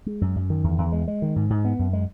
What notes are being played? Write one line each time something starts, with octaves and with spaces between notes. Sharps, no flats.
G#3
F#2
F#2
D#3
E2
E2
G#3
G#3
D#3
G#2
G#2
B3
F#2
G#3